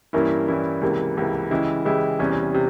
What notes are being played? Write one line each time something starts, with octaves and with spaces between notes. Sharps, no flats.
G2 E3 A#3 C#4 E4
G2 E3 A#3 C#4 E4
C#2 C3 E3 A#3
C#2 C3 E3 A#3
C#3 E3 G#3 E4 G4
C#3 E3 G#3 E4 G4
E2 C3 E3 G3 C#4
C3